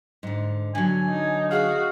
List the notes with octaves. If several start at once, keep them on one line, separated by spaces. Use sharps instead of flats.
G#2 D3
D3 F#3 G#5
D#4
F#4 G#4 F5